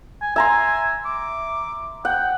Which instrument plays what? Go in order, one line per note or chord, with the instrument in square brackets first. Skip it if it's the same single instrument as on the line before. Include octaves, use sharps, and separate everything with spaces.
[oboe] G#5
[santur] E5 A#5 C6 [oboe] G#5
[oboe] D6
[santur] F#5 [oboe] G5